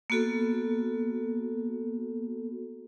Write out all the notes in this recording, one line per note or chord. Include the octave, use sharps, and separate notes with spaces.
A#3 B3 F#4 A4